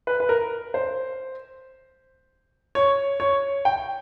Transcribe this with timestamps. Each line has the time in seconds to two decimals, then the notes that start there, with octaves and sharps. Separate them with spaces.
0.07 B4
0.20 B4
0.29 A#4
0.74 C5
2.75 C#5
3.20 C#5
3.65 G5